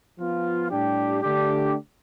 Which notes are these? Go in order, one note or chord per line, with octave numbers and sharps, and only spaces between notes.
F3 B3 F4
A2 G3 D4 G4
D3 A3 D4 G4